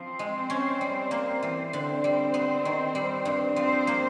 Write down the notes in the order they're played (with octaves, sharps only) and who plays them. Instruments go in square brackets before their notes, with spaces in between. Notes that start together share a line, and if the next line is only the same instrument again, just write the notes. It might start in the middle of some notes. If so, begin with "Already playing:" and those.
Already playing: [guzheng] F3 [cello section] C4 C5
[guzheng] G#3
C#4
G3
A#3
E3
[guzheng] D3 [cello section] C4 C5
[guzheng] G3
B3
D#3
G3
G2
[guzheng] F3 [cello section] C4 C5
[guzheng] A#3